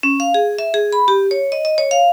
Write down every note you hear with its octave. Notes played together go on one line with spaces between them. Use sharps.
C#4
F5
G#4
E5
G#4
B5
G4
C#5
D#5
D#5
C#5
F5